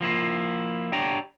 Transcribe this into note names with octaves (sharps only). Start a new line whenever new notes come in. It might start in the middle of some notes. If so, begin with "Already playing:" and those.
F3 A#3 E4 F4
D4 G4 C#5 D5 G5 A#5